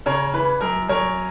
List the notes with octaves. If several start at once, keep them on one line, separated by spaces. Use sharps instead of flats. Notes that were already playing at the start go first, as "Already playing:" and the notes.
C#3 A#4 C#5
E3 B4
F#2 A#4
F#2 A#4 C#5